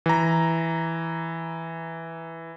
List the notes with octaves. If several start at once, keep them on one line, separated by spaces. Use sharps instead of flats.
E3 A#5